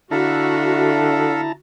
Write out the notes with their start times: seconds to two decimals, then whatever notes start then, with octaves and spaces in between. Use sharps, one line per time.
0.11 D3 E4 F#4 A4 E5 F5 A5 A#5